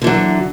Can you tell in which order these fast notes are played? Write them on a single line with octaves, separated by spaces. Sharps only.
D3 E3 F#3